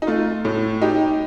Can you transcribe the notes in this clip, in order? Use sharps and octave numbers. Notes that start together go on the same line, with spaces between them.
D#4
A3 F4
A2
D#4 G4